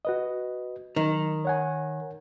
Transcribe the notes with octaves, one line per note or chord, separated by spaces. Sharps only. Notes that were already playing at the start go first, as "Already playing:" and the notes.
F#4 B4 D#5
D#3 F#3
C#5 F#5 G#5